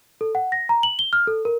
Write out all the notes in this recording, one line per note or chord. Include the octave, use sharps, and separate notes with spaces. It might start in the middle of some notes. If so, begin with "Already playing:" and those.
A4
F#5
A#6
A#5
F#7
G7
F6
A4
A#4